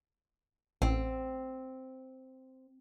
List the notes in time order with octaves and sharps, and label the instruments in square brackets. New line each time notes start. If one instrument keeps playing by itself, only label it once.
[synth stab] A1 [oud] C4